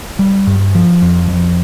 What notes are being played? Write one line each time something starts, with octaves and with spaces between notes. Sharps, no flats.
G3
G2
F3
F2
F2